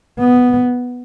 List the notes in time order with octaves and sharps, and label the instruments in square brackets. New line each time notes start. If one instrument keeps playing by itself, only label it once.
[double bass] B3